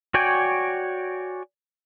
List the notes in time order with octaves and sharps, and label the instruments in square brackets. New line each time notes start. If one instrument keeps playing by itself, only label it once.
[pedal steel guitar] F#4 C#5 D5 G5 G#5